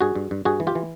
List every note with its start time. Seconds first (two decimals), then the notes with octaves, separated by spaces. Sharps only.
0.01 G2 F#4 G#4
0.15 G2
0.31 G2
0.45 G2 F#4 G#4
0.60 E3
0.67 F4 G4
0.75 E3